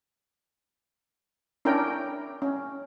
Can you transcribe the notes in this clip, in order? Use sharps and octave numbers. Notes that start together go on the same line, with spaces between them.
C#4 D4 E4 A#4 G5
C#4